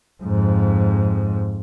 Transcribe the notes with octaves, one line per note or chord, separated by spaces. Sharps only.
F2 G#2